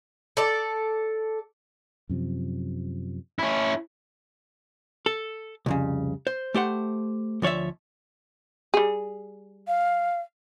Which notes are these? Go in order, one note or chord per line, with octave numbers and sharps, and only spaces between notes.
A4 D5
F#2 C3 F3
C#4 E4
A4
C2 F2 C#3
C5
A3 G4 C5 F#5
D2 F3 C#5 D5 E5
G3 G#4
F5